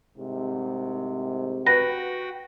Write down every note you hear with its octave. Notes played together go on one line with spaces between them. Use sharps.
C2 G#2 C3
F#4 B4 F#5 G5 A#6